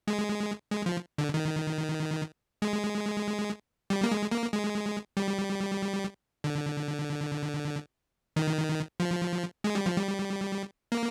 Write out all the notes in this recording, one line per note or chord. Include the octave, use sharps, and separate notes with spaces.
G#3
G#3
F3
D3
D#3
G#3
G3
A#3
G#3
A#3
G#3
G3
D3
D#3
F3
G#3
G3
F3
G3
A#3